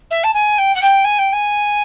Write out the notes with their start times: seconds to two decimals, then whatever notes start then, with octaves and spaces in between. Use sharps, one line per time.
0.10 E5
0.23 A5
0.33 G#5
0.58 G5
0.74 F#5
0.81 G5
1.04 G#5
1.18 G5
1.32 G#5